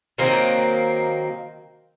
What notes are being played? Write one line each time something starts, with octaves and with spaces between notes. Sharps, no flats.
D#3 F#3 A#3 C4